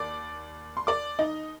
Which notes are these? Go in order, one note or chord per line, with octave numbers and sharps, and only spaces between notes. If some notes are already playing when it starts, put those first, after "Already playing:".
Already playing: D#2 D5 D6
C6
D5 D6
D#4 D#5